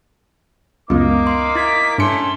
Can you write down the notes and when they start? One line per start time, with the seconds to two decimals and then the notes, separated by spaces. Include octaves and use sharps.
0.90 C#2 F#2 A#3 B3 D#4 D6
1.27 F5 C6
1.55 E4 G#6 B6
1.98 G2 A3 C#4 C6 C#7